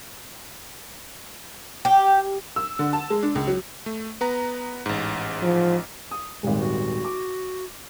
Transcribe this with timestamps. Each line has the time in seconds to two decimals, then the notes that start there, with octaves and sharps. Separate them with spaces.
1.85 G4
2.56 E6
2.79 D3
2.93 A5
3.10 G#3
3.23 D4
3.35 C#2
3.47 F#3
3.86 A3
4.21 B3 B4 A#5
4.86 A1 G#2
5.43 F3
6.11 D#6
6.43 D#1 G#1 G#3
6.60 F#4
7.05 D6